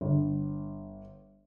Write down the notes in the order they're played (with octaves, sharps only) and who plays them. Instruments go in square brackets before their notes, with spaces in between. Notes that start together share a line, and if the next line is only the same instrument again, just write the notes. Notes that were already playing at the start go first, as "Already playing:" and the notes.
[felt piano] G1